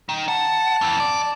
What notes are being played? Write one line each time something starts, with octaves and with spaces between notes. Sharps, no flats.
D#3
F#5 A5
F2 E3
D5